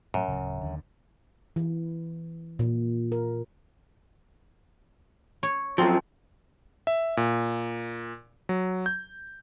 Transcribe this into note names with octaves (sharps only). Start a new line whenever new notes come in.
F#2 A2 F#3
D1 C#3
D#2 D3
E3
A#2
A#4
C#5
F#2 F3 C4
E5
A#2
F#3
G6